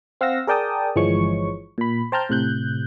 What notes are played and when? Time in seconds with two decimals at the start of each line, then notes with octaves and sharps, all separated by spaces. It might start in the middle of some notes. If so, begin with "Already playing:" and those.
0.21 C4 F5 F#5 E6 A#6
0.47 G#4 A#4 D5 G5 A5 D#6
0.96 G1 E3 F3 G#3 C#5 C#6
1.78 A#2 B5
2.12 C5 G5 A5 A#5 F6 G6
2.29 A2 C3 F#6 G6